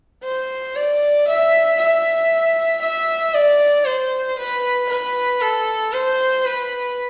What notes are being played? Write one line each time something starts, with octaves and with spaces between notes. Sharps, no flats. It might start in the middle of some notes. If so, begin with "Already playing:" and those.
C5
D5
E5
E5
E5
D5
C5
B4
B4
A4
C5
B4